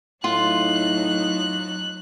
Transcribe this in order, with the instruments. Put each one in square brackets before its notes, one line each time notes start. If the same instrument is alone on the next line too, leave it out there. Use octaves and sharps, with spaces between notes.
[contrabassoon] A2 [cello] F#3 D#4 [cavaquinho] F4 [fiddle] F#6